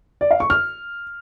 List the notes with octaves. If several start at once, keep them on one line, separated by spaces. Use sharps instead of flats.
D5
F5
C#6
F6